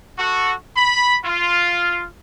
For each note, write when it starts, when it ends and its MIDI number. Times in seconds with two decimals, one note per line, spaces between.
0.19 0.54 66
0.19 0.54 69
0.77 1.17 83
1.25 2.06 65